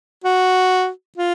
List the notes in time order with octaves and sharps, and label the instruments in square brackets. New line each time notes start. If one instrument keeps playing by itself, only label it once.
[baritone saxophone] F#4
F4